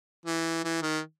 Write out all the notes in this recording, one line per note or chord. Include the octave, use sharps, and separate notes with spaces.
E3
E3
D#3